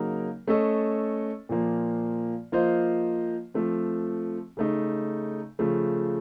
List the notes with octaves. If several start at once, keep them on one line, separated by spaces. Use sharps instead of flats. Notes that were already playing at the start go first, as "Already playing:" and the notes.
Already playing: C#3 F#3 A#3 D#4 A#4
A3 C#4 A4 D#5
A#2 F3 A#3
F3 A#3 F4 C5 D#5
F3 A3 C4
C#3 A3 D#4
C#3 F3 A3